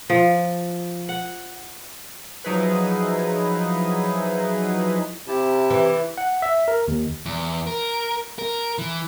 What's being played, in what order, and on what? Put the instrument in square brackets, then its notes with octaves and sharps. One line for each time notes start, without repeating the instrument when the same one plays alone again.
[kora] F3
F#5
[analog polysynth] F3 F#3 D#4 E4 G#4 B4
[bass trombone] C3 [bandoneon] E4 G4 A5
[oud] E3
[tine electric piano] F#5
E5
A#4
D#2
[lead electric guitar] E2
A#4
A#4
E3